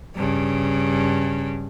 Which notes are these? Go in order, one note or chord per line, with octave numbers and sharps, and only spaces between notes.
G2 C#3